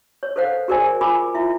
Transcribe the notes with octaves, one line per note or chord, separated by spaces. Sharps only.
C#5
A4 B4 C5 F5 F#5
F#4 G#4 A#4 C5 D5 G#5
F4 A#4 G#5 B5 D6
E4 F4 E5